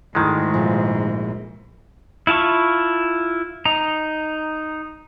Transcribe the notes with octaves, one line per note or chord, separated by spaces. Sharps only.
D2 G#2 D#3 G#3 E4 A5 A#6
A#1
E4 F4 A5 C#6
D#4 A#5